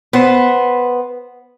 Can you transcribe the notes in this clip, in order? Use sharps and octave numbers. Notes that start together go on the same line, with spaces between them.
B3 C5